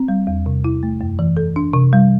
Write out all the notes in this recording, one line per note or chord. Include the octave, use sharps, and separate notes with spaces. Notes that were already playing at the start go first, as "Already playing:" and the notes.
Already playing: C4
G3
E2
C3
E4
A3
F#2
E3
A4
D4
C3
G3